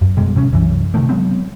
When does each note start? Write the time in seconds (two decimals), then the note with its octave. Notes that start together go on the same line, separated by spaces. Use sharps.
0.01 F#2
0.17 B2 G3 G#3
0.35 D1 C3 C4 C#4
0.52 C2 F#2 E3
0.94 C3 D#3 A3 A#3
1.09 F#3 G#3 B3 C4